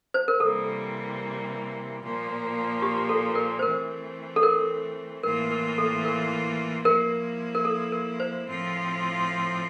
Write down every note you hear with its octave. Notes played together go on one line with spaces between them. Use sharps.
C5
A#4
C3 E3 G3 A#3 A4
A#2 F3 A#3
G4
A4
A#4
C5
E3 A3 C4 A#4
A4
A#4
A2 E3 A#3 F4 A#4
A#4
A4
A#4
F3 A#3 E4 A#4
A#4
A4
A#4
C5
A2 F3 C4 F4